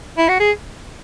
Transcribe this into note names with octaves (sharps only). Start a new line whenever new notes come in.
E4
F#4
G#4